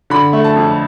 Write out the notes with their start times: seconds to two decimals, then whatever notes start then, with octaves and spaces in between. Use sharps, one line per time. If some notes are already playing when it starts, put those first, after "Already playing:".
0.10 D3 B5
0.33 A3
0.44 A5
0.56 F2